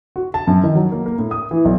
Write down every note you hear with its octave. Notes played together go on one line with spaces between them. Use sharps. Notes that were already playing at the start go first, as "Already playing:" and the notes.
F#4
A5
F#2
D#3
F#3
A#3
A#3
A2
D#6
E3
B1